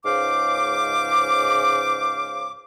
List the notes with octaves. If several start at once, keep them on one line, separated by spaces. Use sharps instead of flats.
C#2 G#2 C#3 C5 F5 D6